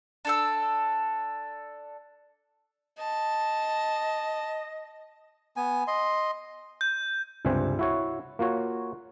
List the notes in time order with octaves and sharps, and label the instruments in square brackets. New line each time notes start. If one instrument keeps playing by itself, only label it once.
[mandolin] D4 A4 E6
[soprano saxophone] D#5 [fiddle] A5
[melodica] B3 G#5
D#5 C6
[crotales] G6
[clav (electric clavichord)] C#2 G2 C3 C4 G#5
E4 F#4 C#5
A#3 F4 F#4 C#5